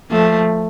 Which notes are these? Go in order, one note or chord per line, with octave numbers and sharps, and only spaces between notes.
F3 A3